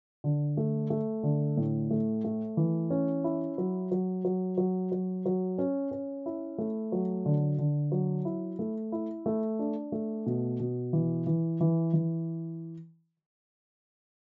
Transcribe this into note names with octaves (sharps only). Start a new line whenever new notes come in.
D3
A3
A3
D3
A2
A3
A3
E3
C#4
E4
F#3
F#3
F#3
F#3
F#3
F#3
C#4
C#4
E4
A3
F#3
D3
D3
F#3
E4
A3
E4
A3
D4
A3
B2
B2
E3
E3
E3
E3